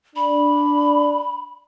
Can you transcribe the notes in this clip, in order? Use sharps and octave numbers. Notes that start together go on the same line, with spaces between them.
D4 B5